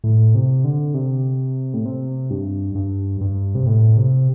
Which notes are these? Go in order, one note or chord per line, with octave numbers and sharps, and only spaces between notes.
A2
C3
D3
C3
A2
C3
G2
G2
G2
C3
A2
C3